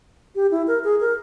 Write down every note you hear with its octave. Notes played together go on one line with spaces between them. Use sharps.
G4
E4
A#4
G#4
A#4